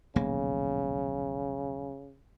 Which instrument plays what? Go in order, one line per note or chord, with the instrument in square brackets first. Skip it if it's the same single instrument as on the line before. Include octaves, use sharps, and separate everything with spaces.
[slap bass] D#1 B1 A#3 [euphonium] C#3